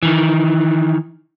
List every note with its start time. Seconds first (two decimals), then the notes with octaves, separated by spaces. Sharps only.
0.03 D#3 E3